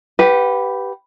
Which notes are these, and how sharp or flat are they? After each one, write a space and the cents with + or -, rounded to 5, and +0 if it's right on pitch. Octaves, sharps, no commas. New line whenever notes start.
G4 -10 B4 +0 F#5 -40